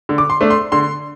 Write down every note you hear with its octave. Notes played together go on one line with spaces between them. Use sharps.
D3
D6
C6
A3 D4
C6
D3 C6